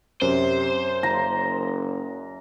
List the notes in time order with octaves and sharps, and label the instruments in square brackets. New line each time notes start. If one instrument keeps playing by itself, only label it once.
[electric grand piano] F#2 [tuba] C3 [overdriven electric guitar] C5
[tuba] F#1 [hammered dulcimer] A#5